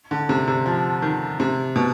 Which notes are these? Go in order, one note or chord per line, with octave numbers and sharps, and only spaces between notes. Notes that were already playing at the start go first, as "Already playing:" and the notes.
D3
C3
C3
F3
D#3
C3
B2